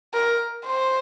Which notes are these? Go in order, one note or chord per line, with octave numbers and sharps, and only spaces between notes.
A#4
C5